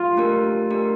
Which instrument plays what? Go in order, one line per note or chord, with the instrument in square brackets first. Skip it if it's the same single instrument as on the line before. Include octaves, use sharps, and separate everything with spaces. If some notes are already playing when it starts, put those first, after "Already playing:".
Already playing: [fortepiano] F4
[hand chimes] A3 D4 G4 A#4
A3 D4 G4 A#4